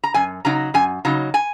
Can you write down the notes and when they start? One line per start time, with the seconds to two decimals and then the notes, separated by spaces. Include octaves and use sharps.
0.04 A#5
0.14 F#2 G#5
0.45 C#3 F#3 D#4 A#5
0.74 F#2 G#5
1.05 C#3 F#3 D#4 A#5
1.34 G#5